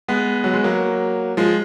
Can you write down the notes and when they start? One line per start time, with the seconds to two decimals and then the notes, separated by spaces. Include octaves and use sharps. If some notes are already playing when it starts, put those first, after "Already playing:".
0.08 G#3 B3
0.44 F#3
0.54 G#3
0.64 F#3 A#3
1.37 F3 G#3